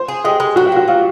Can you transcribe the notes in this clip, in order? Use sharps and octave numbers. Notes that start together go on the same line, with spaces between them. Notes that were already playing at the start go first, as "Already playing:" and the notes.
Already playing: C5
G#4
G#3 G4
G#3
F#3 F#4
G4
A#3 F#4
F#3 F4